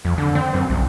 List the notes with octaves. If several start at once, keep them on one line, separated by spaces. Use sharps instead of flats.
F2
D3
C4
F#2
C2